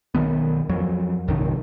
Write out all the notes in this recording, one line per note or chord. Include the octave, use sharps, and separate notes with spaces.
B1 D#3 B3
F2 F#3
A#1 F#2 C3 D#3